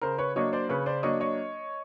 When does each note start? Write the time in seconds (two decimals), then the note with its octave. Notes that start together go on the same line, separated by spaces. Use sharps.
0.02 C#3 A#4 C5
0.18 B4 C#5
0.36 F#3 A#3 D4 C#5 D#5
0.53 C5 D5
0.69 C#3 B4 C#5
0.86 C5 D5
1.03 F#3 A#3 D4 C#5 D#5
1.20 C#5 D#5